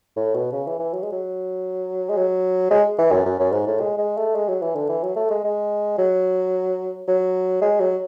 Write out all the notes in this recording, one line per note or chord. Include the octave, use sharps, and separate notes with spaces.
A2
B2
C#3
E3
E3
F#3
G#3
F#3
G#3
F#3
G#3
E3
F#2
F#2
F#2
G#2
A2
G#3
G#3
A3
G#3
F#3
E3
D3
E3
F#3
A3
G#3
G#3
F#3
F#3
G#3
F#3